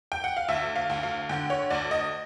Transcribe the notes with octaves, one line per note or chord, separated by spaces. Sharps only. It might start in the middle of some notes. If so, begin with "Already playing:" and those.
G5
F#5
F5
D2 E5
F5
D2
F5
D3 G5
C#5
D2 D5
D#5